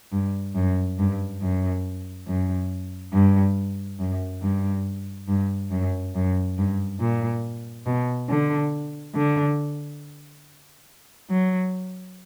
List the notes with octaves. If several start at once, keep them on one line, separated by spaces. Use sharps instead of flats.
G2
F#2
G2
F#2
F#2
G2
F#2
G2
G2
F#2
F#2
G2
A#2
B2
D3
D3
F#3